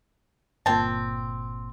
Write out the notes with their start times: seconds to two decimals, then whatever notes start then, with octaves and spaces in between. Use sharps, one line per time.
0.66 G1 A#2 C4 A5